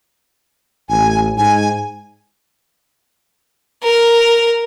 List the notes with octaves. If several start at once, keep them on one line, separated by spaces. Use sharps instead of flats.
A1 G#5
G#2 G#5
A#4